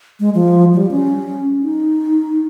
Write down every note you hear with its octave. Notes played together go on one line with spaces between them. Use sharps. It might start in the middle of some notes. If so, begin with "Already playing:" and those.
G#3
F3
F3
G3
C#4
D#4